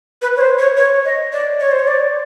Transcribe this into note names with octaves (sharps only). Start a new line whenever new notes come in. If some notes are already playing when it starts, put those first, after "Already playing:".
B4
C#5
C5
C#5
C#5
D#5
D5
C#5
C5
C#5
D5